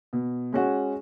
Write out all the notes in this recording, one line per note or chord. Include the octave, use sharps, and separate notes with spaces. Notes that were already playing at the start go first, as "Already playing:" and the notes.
B2
G#3 C#4 F#4